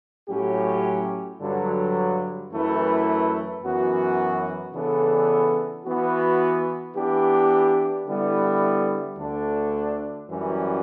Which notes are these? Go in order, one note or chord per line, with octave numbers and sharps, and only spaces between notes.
A2 F#3 C#4 G4
G2 D3 F#3
F#2 E3 A3 E4 B4
F#2 E3 B3 F#4
C#3 E3 B3 D4 A4
E3 B3 F#4
E3 B3 D4 G4
D3 G3 B3 E4
D2 D3 A3 D4
F#2 E3 G3 C#4 F#4